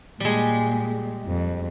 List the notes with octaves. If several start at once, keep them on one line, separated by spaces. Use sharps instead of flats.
A#2 G3 G#3
F2